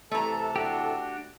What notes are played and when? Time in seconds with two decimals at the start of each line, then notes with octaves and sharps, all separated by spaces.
0.11 C3 E3 A3 A4 A5 A#5
0.56 D4 F#4 G4